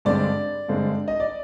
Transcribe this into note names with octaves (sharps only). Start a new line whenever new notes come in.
G2 D3 G#3 C4 D5
G2 D3 G#3 C4
D#5
D5